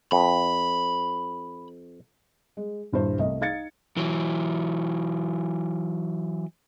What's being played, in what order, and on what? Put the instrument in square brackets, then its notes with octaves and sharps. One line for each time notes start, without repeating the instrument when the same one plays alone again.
[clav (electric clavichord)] F2 [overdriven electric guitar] B5
[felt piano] G#3
D#1 G2 E4 C5
C2 A3 D#5
D#4 F5 G#6 A6 C#7
[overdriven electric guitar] E3 F#3